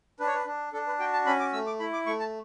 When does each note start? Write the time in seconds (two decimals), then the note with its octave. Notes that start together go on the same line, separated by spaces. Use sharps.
0.20 D4 B4
0.27 C#5
0.34 B4
0.46 D4
0.73 D4 A4
0.87 B4
0.99 F#4 G5
1.13 A5
1.26 C#4 B5
1.40 D6
1.53 A3 E6
1.67 D6
1.80 E4 B5
1.93 D6
2.06 A3 C#6
2.20 A5